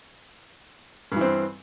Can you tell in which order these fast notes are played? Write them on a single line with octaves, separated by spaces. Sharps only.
G2 E3 C4